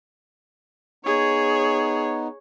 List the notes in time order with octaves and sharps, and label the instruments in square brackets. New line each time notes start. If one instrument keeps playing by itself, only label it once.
[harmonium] B3 D#4 [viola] G#4 C#5